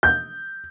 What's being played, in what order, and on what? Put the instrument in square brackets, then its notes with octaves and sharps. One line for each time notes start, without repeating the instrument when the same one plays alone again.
[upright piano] G6